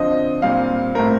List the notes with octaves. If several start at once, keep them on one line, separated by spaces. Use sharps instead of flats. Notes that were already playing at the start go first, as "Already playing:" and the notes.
Already playing: D3 F3 C4 D#5
A#2 G3 C4 F5
A2 A3 C4 A#4